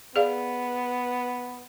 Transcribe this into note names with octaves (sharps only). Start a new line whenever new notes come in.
B3 G#4 D5 F5